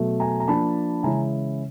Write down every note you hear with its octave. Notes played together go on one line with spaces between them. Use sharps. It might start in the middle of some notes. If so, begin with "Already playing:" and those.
Already playing: B2 F#3 A3
G#5 A#5
A#5
F3 A#3 D4 A5 B5
C#3 E3 G#3 C#4 E4 G#5 A#5